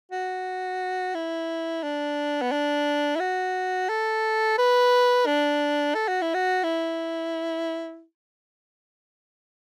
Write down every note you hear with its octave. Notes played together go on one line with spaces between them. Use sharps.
F#4
E4
D4
B3
D4
E4
F#4
A4
B4
D4
A4
F#4
E4
F#4
E4